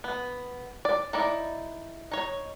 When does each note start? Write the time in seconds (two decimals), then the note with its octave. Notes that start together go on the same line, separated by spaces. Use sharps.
0.04 B3
0.85 D5
1.13 D#4 E4 D5
2.11 D#4 C#5